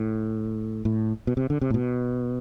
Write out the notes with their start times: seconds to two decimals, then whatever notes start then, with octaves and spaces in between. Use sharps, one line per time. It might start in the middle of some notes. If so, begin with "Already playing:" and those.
Already playing: A2
0.85 A2
1.27 B2
1.37 C3
1.50 D3
1.61 C3
1.70 A2
1.74 B2